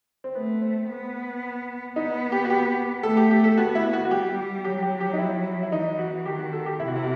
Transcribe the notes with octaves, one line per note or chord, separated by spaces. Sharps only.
C4
A3 B3
C4
B3
B3 D#4
G4
F#4
G4
A3 A4
G4
G4
A4
B3 F#4
E4
F#4
F#4
G3 G4
F#3 G4
G4
G4
D#4
E4
E4
E3 D#4
F#4
D#3 G4
F#4
A4
G4
C3 E4
F#4
E4